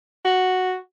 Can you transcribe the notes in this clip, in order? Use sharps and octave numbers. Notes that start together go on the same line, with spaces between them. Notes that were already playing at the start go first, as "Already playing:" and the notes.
F#4